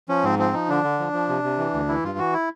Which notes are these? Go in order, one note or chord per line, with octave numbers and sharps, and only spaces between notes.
F3 C#4
G#2 C4
F3 C4
F3 D#4
D3 D4
D3
F3
F3
C3
C3
E3
D2
E3 E4
G2 F4
E3 F#4
E4